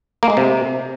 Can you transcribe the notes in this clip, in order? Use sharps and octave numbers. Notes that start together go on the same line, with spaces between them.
A#3
G#3
C3